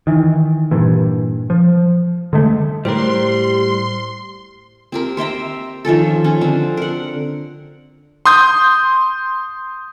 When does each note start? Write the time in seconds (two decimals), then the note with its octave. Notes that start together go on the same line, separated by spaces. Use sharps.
0.07 D#3 E3
0.71 G2 A#2 E3
1.50 F3
2.33 D3 G#3 A3
2.85 A2 G3 G4 A#4 C5 C6
4.92 C4 G4 A#4
5.17 C5 E5 G5 A#5
5.85 D#3 F3 C#4 A4
6.24 C#4
6.41 D3 C4
6.77 A#4 F#5
8.26 C6 D#6 G6